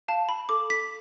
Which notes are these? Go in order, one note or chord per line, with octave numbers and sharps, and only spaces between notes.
F5 A5
B5
A4 D6
B6